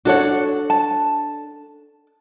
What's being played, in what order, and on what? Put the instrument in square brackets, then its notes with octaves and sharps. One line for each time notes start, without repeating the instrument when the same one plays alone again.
[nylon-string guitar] D4 A4 C#5 [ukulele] F#4 F#5
[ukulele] A5